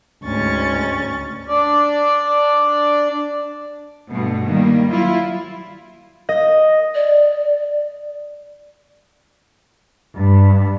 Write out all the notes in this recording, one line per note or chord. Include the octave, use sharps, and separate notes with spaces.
D2 G#2 C#4 C#6 A6
D4 D5
G2 B2 A3
D#3 G3 A#3
F#3 E4 F4
D#5
D5
G2